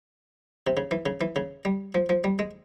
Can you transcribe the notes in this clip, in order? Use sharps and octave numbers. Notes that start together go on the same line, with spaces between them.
C3
C#3
E3
C#3
E3
C#3
G3
F3
F3
G3
G#3